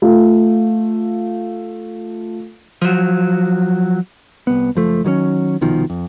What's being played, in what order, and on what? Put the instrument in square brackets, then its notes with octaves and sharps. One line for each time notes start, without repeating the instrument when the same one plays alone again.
[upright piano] A3 F4
[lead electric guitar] F3 F#3
[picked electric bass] C2 B3
F#1 F3 A3
D#3 F#3 G3 C#4
C2 B2 D#3 F3
F2